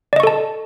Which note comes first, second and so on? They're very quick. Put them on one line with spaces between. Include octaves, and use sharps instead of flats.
D5 D#5 C#6 A4 A5